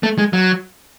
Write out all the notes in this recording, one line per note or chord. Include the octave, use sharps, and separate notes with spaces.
A3
G#3
F#3